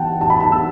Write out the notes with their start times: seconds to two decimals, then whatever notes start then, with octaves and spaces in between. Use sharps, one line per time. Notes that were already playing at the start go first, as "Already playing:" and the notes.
Already playing: E3 F#5 G5 A5
0.21 A5
0.30 B5
0.40 A5
0.52 E6